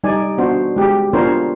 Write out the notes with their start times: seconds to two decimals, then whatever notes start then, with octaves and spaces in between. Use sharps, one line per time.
0.04 G3 D#4 D5 G#5
0.38 B3 D4 F#4 C5
0.76 G#3 G4
1.13 B3 D4 F4 A#4 C5 C#5